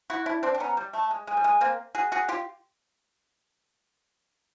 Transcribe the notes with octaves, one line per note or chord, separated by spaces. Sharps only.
E4 F#4
D4 E4
C4 D4
D4
B3 C#4 A#5
G3
A3 A5
G#3
G#3 G#5
G3
G#3
A#3 C4
F#4 G#4
F#4 G#4
F4 G4